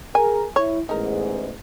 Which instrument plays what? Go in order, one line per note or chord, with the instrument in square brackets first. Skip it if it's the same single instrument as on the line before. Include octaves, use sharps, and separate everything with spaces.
[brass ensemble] G#4 A#4 [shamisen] G#5
[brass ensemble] E4 [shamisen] C#5
[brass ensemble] A1 E2 G#2 [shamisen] D#4 A#4